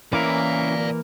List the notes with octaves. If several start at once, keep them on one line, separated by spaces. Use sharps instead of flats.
E3 A#3 C#4 E4 A#4 D5 F5